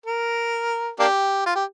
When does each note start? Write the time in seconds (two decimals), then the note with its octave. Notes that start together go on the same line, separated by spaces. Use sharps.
0.06 A#4
0.99 A#3 D4 G4
1.46 F4
1.55 G4